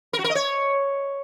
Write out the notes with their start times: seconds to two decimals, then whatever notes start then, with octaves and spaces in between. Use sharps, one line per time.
0.13 A#4
0.19 F#4
0.24 A#4
0.30 D#5
0.35 C#5